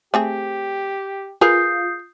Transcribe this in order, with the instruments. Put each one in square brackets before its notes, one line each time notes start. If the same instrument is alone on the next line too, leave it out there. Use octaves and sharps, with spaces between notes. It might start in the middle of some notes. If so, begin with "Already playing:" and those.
[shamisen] A3 C4 G#4 [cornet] G4
[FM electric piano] F4 [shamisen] G#4 A#4 B4 [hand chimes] D#6 G6 C7